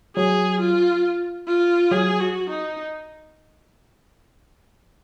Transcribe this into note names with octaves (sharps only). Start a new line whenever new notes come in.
F#3 G#4
F4
F4
F#3 G#4
F#4
D#4